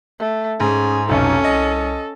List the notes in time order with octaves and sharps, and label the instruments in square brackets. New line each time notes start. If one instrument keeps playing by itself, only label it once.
[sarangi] A3
[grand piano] G#2 [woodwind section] C#4 G#4 [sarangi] G#5
[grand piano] F1 B1 [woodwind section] G2 D#4 [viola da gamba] C#4 [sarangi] A4
[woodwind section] C2 [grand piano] D#5